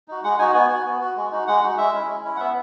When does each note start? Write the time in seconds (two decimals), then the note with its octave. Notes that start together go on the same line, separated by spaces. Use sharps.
0.08 D#4 F#4
0.23 G#3 F#5
0.39 D#4 F#4 G#5
0.54 B3 G#5
0.70 F#4
0.85 B3
1.01 F#4
1.17 G#3
1.32 D#4 F#4
1.47 G#3 F#5
1.63 D#4 F#4
1.78 G#3 E5
1.93 C#4 E4
2.09 G#3
2.24 C#4 E4
2.36 F#5
2.40 B3 E5